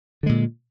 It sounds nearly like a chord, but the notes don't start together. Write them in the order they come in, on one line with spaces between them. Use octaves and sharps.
D3 G#3 A#2